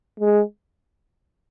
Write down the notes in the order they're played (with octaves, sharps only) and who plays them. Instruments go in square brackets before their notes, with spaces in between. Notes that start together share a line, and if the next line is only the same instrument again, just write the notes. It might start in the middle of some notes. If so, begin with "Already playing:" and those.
[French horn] G#3